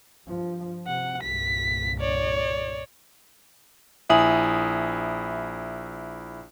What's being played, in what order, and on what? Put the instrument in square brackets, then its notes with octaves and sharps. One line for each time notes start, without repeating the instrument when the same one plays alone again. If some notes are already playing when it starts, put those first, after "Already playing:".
[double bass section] G2 F3
[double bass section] C3 [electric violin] F#5
[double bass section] C2 G2 A#2 [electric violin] B6
[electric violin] C#5 D5
[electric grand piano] A#1 E4 D#6 [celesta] E5 G#5 F#7